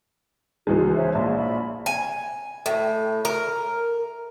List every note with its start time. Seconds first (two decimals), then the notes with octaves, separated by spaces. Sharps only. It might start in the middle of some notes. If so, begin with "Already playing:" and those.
0.67 C#2 E3 G#3 F#4
0.95 C5 C#5 E5
1.15 A#1 E5 F5 C6
1.36 E5 B5
1.86 G#5
2.66 A2
3.25 A#4